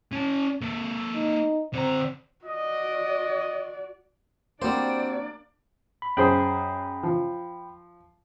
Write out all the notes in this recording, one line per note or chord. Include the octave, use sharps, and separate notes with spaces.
C#4 A5
A#3 A4
D#4
D3 C4 A#5
F#4 D5 D#5
G3 A#3 C4 D4 F#4 C5 D5
B5
F#2 G#4 C5 G5 B5
F3